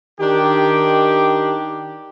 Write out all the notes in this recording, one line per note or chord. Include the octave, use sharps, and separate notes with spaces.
D#3 D4 G4